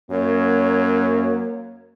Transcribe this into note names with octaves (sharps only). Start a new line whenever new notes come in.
F#2 A#3 C#5